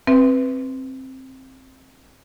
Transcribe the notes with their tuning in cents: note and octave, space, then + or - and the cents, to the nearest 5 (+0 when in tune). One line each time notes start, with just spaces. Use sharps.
C4 +15 B4 +0 E5 +0